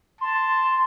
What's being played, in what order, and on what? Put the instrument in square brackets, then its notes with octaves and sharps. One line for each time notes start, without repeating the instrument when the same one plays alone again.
[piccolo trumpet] A5 [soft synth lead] C6